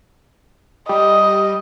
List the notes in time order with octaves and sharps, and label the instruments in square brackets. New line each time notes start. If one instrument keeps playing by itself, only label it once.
[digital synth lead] G3 [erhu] D#5